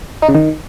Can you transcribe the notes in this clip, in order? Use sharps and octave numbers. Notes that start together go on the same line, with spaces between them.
D#4
C#3
D#3